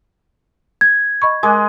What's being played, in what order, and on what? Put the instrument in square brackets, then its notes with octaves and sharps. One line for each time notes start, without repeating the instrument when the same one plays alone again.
[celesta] G#6
[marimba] D#5 B5 C#6
[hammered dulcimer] G#3 [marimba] A#4 D6 F#6